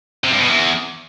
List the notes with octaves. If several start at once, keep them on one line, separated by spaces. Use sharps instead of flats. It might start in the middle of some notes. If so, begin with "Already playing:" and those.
C3
G2
B2
E2